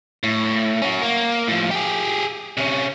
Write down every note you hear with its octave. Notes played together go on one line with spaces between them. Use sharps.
A2
C#4 F#4
A#3
A2 F3
G4 G#4
C3 C#4